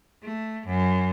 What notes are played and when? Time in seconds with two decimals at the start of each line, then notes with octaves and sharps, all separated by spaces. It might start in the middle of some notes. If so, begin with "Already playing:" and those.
0.23 A3
0.66 F#2